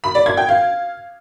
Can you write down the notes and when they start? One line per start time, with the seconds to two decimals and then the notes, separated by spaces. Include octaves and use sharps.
0.04 B5
0.15 D5
0.26 G#6
0.37 G5
0.49 F5